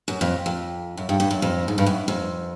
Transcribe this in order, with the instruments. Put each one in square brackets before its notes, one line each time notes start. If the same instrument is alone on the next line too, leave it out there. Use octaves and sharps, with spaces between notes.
[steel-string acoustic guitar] F#2
F2
F2
F#2
G2
G2
F#2
F2
G#2
G2
F#2
F2